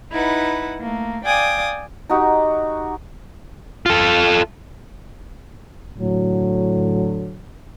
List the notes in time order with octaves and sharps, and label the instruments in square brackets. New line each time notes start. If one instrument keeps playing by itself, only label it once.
[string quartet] D#4 E4 B4 F#5
A3 A#3
D5 F5 G5 G#5 D6 D#6
[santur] D#4 F#4 G4
[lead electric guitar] F4 A4
[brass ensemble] A2 D3 F#3